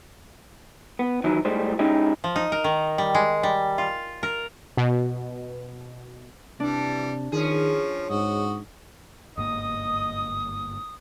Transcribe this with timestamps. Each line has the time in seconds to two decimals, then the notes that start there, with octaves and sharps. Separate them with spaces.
0.99 B3
1.24 D#3 E3 F#3 E4
1.45 A2 G3 G#3 C5
1.79 G#3 C#4 D#4 E4 G4
2.24 F3
2.36 D#4
2.52 A#4
2.64 D#3
2.98 G3
3.15 G#3
3.43 G3
3.78 F4
4.23 A#4
4.77 B2
6.60 C3 E3 G3 D4
7.32 D#3 F3 C#4 G#4
8.10 G#2 F#4 D#5
9.38 G1 G#2 A#3 D#5 D#6